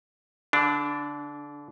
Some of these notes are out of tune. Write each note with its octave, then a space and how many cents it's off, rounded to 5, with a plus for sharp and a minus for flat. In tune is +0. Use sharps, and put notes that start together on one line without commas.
D3 -35 D4 +0